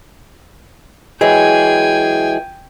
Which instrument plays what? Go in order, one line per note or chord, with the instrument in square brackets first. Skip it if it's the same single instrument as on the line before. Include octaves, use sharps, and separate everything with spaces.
[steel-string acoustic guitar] E3 F#3 G#3 [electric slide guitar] G#4 [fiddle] G5 G#5